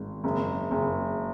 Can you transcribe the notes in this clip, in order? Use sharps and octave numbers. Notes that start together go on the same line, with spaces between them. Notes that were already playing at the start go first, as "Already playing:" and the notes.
Already playing: G#1
F#1
F#1